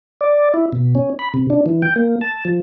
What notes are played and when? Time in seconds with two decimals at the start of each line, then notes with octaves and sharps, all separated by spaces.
0.21 D5
0.54 E4
0.73 B2
0.95 C#4
1.19 B5
1.34 C3
1.50 D4
1.66 E3
1.82 G5
1.96 A#3
2.21 A5
2.45 F3